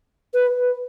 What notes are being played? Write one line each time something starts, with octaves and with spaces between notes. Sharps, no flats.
B4